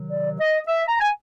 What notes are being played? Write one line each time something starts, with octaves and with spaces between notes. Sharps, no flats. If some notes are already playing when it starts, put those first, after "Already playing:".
Already playing: C3 D#3 F#3
D5
D#5
E5
A#5
G#5